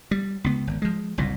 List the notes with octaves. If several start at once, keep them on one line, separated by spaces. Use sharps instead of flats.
G3
C#2 B3
G#1
F3 G#3
F#1 C2 A#2